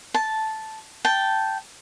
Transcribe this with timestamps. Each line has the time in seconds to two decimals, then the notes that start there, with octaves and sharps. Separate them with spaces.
0.14 A5
1.05 G5 A5